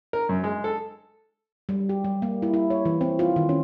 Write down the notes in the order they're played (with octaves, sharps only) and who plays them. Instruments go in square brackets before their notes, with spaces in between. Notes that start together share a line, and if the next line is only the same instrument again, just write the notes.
[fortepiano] A#4
F#2
G#3
A4
[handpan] G3
G4
G3
A#3
E4
E4
C#5
E3
C4
F4
D#3
C#4